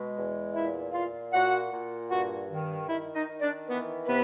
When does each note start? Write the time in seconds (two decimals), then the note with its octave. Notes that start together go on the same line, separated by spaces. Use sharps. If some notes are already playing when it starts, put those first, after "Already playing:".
Already playing: B2 G#3
0.17 E2
0.55 A#2 E4 E5
0.94 A#2 F4 F5
1.33 A#2 F#4 F#5
1.73 A#2
2.11 G2 F#4 F#5
2.51 D#3
2.89 D#3 E4 E5
3.15 D#4 D#5
3.30 D#3
3.42 D4 D5
3.68 E3 B3 B4
4.07 C3 B3 B4